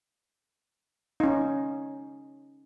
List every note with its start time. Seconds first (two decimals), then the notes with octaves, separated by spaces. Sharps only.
1.20 C#4 D#4